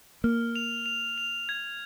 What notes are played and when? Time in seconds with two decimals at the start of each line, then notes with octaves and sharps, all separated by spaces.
0.24 A#3 F6
0.56 F7
0.86 F7
1.18 F7
1.49 G#6